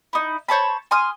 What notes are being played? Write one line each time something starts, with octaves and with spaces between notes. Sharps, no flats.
D#4 E4
C5 C#5 A5 B5
G#5 C6 D#6 F6